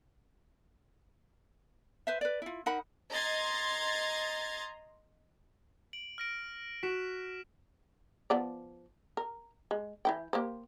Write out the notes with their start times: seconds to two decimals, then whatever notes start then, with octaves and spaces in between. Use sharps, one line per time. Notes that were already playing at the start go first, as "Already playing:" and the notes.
2.07 B4 C5 E5
2.21 B4 D5
2.42 E4 F4
2.66 D#4 A#4 F#5 B5
3.11 D#5 A#5 C6 G#6 A6
5.93 D7 F#7
6.18 F6 A#6 D7
6.83 F#4 B6 E7
8.30 F3 B3 D5
9.17 A#4
9.71 G#3
10.05 E3 E4 G5
10.33 A#3 G4 C5